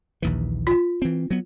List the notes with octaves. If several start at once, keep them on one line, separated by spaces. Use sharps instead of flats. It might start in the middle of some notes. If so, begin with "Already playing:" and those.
A#1 D#2 E3
F4
E3 C4
F#3 B3